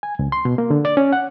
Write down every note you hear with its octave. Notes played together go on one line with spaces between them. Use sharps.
G#5
C#2
C6
B2
A#3
D3
D5
C#4
F#5